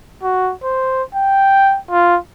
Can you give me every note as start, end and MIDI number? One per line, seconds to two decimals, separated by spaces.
0.23 0.53 66
0.64 1.03 72
1.15 1.79 79
1.91 2.17 65